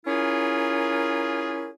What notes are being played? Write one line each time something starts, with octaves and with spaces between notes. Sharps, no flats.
C#4 E4 F4 G#4 A#4